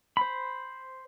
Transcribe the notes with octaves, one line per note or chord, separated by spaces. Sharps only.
C5 B5